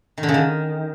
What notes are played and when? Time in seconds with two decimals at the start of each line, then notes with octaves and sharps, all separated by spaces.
0.18 D#3
0.23 D3
0.29 C#3
0.34 D#3